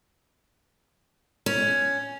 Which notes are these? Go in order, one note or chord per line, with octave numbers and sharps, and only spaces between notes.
C#4